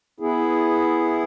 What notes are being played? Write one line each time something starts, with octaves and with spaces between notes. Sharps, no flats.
B3 E4 G#4